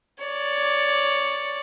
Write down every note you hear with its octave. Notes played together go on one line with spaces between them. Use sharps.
C#5 D5